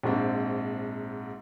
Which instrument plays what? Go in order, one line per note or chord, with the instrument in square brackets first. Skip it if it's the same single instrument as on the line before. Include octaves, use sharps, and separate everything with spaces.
[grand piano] A#1 G#2 C4